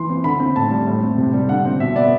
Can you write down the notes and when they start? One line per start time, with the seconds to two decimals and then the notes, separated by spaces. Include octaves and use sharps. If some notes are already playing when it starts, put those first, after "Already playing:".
Already playing: E3 C6
0.10 C4
0.24 D3 B5
0.40 C4
0.56 A2 A5
0.71 G3
0.86 A2
1.03 C4
1.18 C3
1.34 G3
1.49 D3 F#5
1.66 C4
1.80 B2 E5
1.96 B3 D5